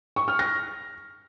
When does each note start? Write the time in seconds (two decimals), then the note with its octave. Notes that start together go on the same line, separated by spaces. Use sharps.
0.16 C#6
0.28 F6
0.39 A#6